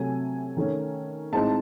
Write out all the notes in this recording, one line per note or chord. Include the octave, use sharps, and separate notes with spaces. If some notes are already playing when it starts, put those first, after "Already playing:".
Already playing: C3 F#3 A3 G#5
D#3 A3 C#4
A2 G#3 C4 D#4 A5